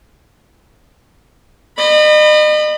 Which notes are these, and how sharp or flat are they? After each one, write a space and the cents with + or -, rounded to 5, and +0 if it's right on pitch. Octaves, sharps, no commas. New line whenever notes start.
D#5 -40 B5 +0